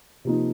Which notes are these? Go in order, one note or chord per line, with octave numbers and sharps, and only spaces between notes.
C3 F3 A#3 D#4